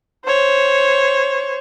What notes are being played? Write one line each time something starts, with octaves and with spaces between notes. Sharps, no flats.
C5 C#5